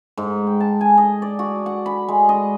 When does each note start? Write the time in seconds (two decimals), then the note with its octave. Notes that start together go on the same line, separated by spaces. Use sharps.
0.17 G#2
0.47 G5
0.60 A5
0.81 G#5
0.98 D#5
1.22 D5
1.39 F#4
1.66 F#5
1.86 B5
2.08 G#3
2.29 D#5